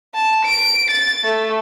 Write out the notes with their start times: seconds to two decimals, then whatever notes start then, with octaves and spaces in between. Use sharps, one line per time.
0.15 A5
0.45 D7
0.90 A6
1.24 A3